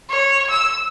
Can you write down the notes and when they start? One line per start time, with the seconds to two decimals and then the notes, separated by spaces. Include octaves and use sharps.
0.10 C#5
0.50 E6